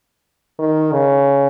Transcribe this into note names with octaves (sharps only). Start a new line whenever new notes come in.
D#3
C#3